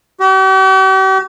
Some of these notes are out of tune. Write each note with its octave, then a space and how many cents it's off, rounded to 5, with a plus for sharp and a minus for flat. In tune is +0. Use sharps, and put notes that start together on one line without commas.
G4 -45